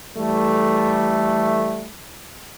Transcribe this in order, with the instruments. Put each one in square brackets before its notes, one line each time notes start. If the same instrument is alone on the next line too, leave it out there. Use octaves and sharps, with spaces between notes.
[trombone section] E3 G3 A3